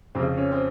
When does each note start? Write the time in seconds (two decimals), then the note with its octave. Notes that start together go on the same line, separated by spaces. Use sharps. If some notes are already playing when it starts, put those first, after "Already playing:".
0.15 F2 C#3 C4
0.37 C#4
0.52 C4